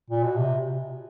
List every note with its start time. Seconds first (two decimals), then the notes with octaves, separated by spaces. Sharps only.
0.10 A#2
0.24 B2
0.37 C3